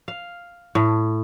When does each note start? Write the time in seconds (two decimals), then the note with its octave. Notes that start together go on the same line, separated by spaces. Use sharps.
0.08 F5
0.75 A2